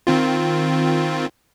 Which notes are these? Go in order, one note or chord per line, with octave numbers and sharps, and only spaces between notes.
D#3 C4 F4